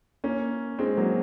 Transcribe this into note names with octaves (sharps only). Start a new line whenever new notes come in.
A#3 C#4
G#3 C4
F#3 A#3